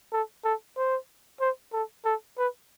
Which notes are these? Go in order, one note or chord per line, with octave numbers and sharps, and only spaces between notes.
A4
A4
C5
C5
A4
A4
B4